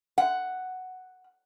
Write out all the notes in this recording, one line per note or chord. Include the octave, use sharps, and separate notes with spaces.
F#5